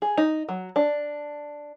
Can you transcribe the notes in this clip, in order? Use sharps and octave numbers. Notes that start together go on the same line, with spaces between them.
G#4
D#4
F#3
D4